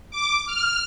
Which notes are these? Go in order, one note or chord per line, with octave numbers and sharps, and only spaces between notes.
D6
F6